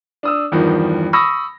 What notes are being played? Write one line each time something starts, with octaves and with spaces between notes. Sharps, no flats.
D4 D#6 E6
E2 G2 D#3 F3
B5 C#6 D#6 E6 A#6